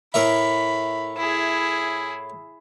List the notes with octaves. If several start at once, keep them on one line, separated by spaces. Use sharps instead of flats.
A2 A#4 E5 B5
E4 G#4